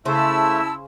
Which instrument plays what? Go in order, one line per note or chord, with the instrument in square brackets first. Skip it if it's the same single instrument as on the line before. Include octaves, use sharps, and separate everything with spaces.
[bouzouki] C#3 C5 [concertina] A3 [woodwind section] E4 [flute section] A5 E6